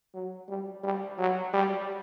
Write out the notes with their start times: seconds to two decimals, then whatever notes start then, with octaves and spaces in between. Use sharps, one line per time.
0.14 F#3
0.48 G3
0.83 G3
1.18 F#3
1.53 G3